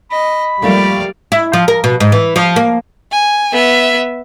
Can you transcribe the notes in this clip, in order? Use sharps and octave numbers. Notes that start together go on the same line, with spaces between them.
D#5 B5
F3 G3 A3 A#3 D5 F5
E4
F3
A#4
B2
G#2
E3
F3
A#3
G#5
B3 E5